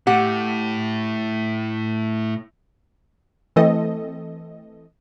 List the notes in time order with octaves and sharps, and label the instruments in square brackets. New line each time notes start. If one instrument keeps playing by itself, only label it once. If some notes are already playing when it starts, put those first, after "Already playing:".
[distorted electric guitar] A2 [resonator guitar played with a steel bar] G4 F#5
[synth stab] E3 A3 C4 A4 D#5